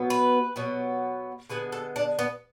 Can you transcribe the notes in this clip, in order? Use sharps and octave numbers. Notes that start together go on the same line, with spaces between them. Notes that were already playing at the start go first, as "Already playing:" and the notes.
Already playing: B2 F#3 B3
B4
B2 F#3 B3
D3 G#3 B3 B4
A4
D4
B3